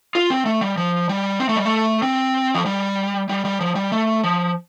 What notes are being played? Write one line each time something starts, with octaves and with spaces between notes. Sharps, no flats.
F4
C4
A3
G3
F3
G3
C4
A3
G3
A3
C4
F3
G3
G3
G3
F3
G3
A3
F3